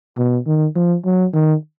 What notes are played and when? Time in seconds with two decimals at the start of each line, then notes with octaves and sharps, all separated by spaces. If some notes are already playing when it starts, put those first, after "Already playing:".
0.17 B2
0.46 D#3
0.75 F3
1.05 F#3
1.34 D#3